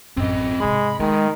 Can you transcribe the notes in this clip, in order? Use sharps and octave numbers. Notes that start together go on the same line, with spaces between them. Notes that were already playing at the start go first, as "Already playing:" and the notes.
A1 F#2 C4 D#5
G#2 C3 G#3 B5
D#3 G#3 A3